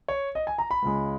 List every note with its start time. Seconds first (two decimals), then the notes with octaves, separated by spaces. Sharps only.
0.08 C#5
0.35 D#5
0.47 G#5
0.58 A#5
0.71 B5
0.82 C#2 C#3 G#3